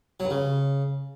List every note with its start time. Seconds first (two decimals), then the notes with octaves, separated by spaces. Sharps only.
0.20 F#3
0.25 G2
0.30 C#3